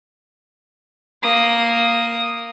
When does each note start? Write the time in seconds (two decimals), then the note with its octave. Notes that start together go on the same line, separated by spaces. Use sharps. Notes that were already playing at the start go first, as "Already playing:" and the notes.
1.23 A#3 D#6